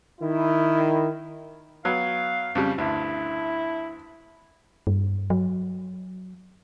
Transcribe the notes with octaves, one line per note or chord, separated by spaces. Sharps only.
D#3 E4
F#3 B3 F5
F2 C#3 G3
D2 G2 E4
G2
F#3